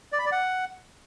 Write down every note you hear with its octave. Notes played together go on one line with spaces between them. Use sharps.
D5
B5
D5
F#5